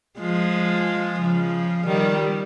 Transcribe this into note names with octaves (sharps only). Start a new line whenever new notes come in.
F3 G#3
C#3 F3
D#3 G3